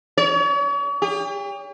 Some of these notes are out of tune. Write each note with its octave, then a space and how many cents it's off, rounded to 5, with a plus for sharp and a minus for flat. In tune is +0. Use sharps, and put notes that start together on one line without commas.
C#5 +40
G4 +40